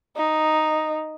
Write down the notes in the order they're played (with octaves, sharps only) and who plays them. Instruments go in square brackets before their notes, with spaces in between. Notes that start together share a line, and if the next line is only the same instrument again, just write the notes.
[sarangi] D#4